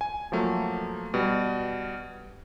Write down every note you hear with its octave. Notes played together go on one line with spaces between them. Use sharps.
G#5
F3 F#3 A3 A#3
B2 G3